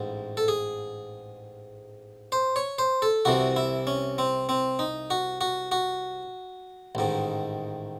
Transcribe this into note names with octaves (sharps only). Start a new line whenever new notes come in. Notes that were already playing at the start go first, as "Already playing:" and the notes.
Already playing: A1 G#2
A4
G#4
C5
C#5
C5
A4
C2 C3 E3 F#4
E4
C#4
C4
C4
D#4
F#4
F#4
F#4
A1 G#2 D#3